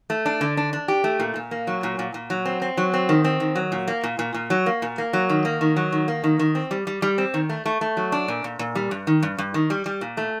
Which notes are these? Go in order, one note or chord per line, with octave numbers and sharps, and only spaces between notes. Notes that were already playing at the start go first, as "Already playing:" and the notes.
A3
D4
D3
D4
D4
G4
A3
A#2
A#2
A#3
F#3
A#2
A#2
A#2
F#3
C4
C4
F#3
C4
D#3
C4
D#3
F#3
A#2
A#3
A#2
A#2
A#2
F#3
A#3
A#2
A#3
F#3
D#3
A#3
D#3
F#3
D#3
A#3
D#3
D#3
C4
G3
G3
G3
C4
D#3
A3
A3
A3
F#3
D4
A#2
A#2
A#2
G3
G2
D#3
G2
G2
D#3
G3
G3
A#2
A3